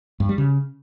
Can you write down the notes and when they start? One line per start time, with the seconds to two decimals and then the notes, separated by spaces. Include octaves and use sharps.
0.20 G2
0.29 G3
0.38 C#3